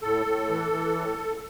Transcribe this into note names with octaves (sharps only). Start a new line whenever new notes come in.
A2 A4
A2
E3
E3
A2